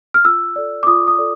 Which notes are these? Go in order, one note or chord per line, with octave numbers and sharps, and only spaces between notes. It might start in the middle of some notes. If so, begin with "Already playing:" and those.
F6
F4 E6
A4 D5
D6
F4 D#6
D#6
A4 D5